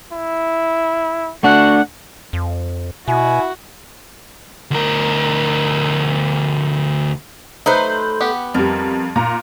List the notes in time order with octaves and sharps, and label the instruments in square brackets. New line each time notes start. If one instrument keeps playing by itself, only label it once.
[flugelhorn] E4
[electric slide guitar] A3 D4 [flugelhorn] F#4 [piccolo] F#5
[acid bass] F2
[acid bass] B2 [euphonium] E4 [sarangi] F#4 [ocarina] G#5
[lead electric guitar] D2 A#4
[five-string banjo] F#3 D#4 [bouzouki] A3 B4 C5
[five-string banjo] B3 G4 F#5
[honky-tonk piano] F2 G3 [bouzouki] A#4
[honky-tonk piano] A#2 A#5